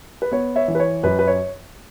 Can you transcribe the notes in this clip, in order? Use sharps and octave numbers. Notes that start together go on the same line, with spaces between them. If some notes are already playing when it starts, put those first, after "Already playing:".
B4
B3 C#5
C#5 E5
E3
B4
C#5
F#2 B4
B4
C#5